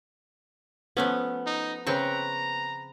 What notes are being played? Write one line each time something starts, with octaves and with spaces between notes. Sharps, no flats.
F3 A3 B3 C#4
D#4
C#3 C4 B4 G5 A#5 C#6